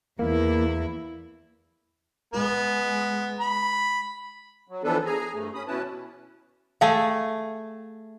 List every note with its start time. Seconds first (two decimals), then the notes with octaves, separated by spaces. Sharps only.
0.19 E2 A#3 E4
2.34 G#3 B3
3.40 B5
4.68 F#3
4.84 E3 F3 B3 D4 A4 B4
5.06 G#4 G#5 A#5
5.34 G2 A3
5.54 C#4 B5 D#6
5.67 B2 E3 C#4 E4 B4 A5
6.81 A3 G#4 F5 G5 A5